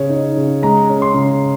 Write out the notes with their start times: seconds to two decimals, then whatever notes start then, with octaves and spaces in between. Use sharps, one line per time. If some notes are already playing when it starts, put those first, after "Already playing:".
Already playing: C#3 C#5
0.10 D#4
0.37 C#3
0.62 G#3 A#5
0.89 C#4
1.02 C6
1.14 C#3